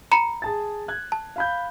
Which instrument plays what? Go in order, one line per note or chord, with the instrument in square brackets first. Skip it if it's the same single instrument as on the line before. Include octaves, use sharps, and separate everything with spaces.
[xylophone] A#5 B5 C#7
[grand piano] G#4 A5 A6
F#6 G#6
[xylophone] A5
[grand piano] F5 B5 G6